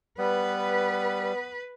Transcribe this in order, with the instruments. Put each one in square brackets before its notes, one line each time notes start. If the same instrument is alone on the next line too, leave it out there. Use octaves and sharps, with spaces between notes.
[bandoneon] G3 [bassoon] B3 [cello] B4